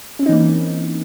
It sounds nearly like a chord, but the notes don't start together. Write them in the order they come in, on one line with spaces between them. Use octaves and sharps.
C#4 C4 D#4 E3 A#3